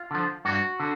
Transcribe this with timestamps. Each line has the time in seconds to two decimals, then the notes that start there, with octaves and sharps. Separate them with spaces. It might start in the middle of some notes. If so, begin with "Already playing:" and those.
Already playing: F4
0.11 D3 F3
0.45 G2 F#4
0.80 D3